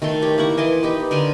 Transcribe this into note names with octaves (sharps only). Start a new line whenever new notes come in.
D#3 A3 A4 C6
G4 C#5
A#3 E4 F#5 C#6
E3 D#5 C6 D6
D#4 G4 B4
D3 A#4 G#5 C6